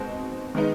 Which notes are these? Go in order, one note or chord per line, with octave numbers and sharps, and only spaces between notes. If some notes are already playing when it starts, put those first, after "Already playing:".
Already playing: B2 G#3 C4 D#4 C5
D#3 G#3 B3 D#4